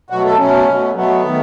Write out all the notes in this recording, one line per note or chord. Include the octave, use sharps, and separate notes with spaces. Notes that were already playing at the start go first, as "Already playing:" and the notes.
B2 F#3 A3 F#4
A4
B2 F#3 A3 C#4
B2 F#3 A3
B2 F#3 A3 B3
D#3 A3